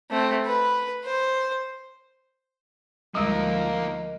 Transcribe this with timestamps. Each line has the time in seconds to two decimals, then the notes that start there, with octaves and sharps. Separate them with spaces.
0.11 A3 C4
0.46 B4
1.05 C5
3.15 D2 F3 G3 G#3 A#3 D#4 A#4 D#5